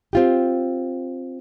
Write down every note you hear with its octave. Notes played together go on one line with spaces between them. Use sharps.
C4 F4 G4